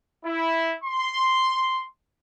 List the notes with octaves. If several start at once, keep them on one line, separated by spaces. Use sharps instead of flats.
E4
C6